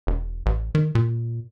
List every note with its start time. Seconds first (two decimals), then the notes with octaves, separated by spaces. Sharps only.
0.07 E1
0.46 A1
0.75 D#3
0.95 A#2